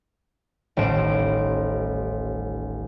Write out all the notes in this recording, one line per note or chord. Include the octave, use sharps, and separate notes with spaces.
D#1 A1 C5 D7 E7